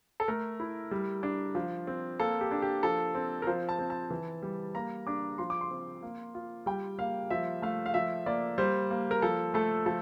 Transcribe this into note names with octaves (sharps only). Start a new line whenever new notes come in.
A4
A3 A#4
E4
G3
D4
F3
C4
A#3 A4
G4
D4
G4
F3 A4
C4
A#4
F3 C5
A5
C4
A5
E3
G3
A#3 A#5
D4 D6
F3 C6
D6
C6
C4
A#3
F4
G3 G5
A#3 F5
F3 E5
A3 F5
F5
F3 E5
A#3 D5
G3 C5
A#3
A#4
F3 A4
A3 A4
F3 A4